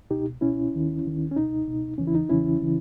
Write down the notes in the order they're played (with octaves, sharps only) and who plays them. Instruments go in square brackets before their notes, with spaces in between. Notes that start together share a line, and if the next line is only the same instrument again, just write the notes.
[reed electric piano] C#2 B2 D#4 G4
C#2 B2 C#4 E4
D#2 D#3
D#2 D#3
C#4
C#2 B2 D#4
C#2 B2
E2 C#3 E3 C#4
E4
D#4
E2 C#3 E3 C#4 E4
C#3 E3